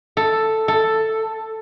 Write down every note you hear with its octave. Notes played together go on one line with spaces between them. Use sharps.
A4
A4